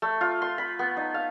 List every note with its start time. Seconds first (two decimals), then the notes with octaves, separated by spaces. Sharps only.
0.02 A3
0.21 F4
0.42 C6
0.58 B5
0.79 B3
0.97 D#4
1.14 F5